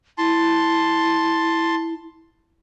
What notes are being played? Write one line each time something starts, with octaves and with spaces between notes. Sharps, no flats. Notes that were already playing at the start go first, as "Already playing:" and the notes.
E4 A5 C6